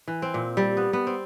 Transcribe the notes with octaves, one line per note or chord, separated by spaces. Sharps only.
E3
C4
A#2
G3
B3
B3
C4